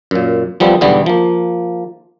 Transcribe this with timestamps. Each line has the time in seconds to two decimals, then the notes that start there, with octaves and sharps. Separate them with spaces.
0.11 F#2 A#2
0.60 F3 G3 B3 C4
0.81 B1 E2 D3 E3 G3 B3
1.06 F3 A#3